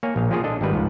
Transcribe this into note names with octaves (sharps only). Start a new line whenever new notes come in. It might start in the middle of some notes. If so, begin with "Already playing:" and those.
A#3 C#5 G#5
A#1 F5
F3 A#3 C#4 F4 G#4 C#5
D4 A4 D#5
G#1 D#3 G3 A3 B4
C#2 G#2 F3